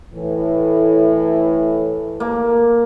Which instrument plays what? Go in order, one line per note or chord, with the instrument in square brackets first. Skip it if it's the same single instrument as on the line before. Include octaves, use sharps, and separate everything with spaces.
[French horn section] A2 E3
[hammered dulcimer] A#3